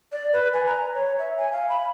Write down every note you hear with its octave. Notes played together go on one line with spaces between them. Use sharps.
D5
B4
G#5
A#5
C#5
E5
G#5
F5
B5